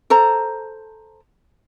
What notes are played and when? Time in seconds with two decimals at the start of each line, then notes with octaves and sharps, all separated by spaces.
0.10 A4 C5 A#5